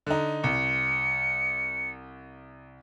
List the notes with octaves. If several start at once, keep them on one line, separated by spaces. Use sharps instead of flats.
D3 D#4
C2 C#7